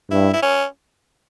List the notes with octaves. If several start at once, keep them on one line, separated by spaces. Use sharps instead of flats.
G2 E4
E4
C#4